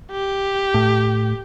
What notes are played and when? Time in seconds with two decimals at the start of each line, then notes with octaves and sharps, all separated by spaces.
0.11 G4
0.74 A2